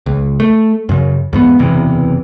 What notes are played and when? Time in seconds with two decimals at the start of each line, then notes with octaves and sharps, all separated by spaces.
0.06 C#2
0.40 A3
0.89 F#2 C#3
1.33 E2 G#2 B3
1.59 F#1 E2 C3 E3